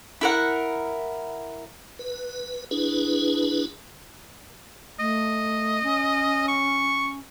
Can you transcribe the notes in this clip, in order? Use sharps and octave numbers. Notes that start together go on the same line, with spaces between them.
E4 A#4 F#5
B4
D4 E4 G#4 B4
A3 D#5
C#4
C#6